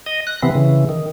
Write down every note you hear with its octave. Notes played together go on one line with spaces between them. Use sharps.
D#5
F#6
C3 E3 B3 C4
C#3 E3
D#3